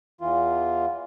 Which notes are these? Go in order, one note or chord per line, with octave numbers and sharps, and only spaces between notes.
E2 E3 F4